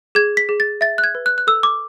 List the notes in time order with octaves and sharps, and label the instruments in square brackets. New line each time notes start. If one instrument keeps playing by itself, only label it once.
[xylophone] G#4 G#6
B6
G#4
A6
E5 A6
F#6
G#6
B4
F#6
F#6
A4 E6
D6